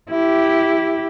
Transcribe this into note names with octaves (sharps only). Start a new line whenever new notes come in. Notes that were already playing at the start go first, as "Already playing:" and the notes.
E4 G4